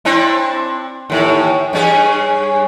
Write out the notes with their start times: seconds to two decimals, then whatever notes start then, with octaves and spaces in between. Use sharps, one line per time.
0.05 C4 D4 E4
1.10 D#2 A2
1.73 G2 C#4 G#4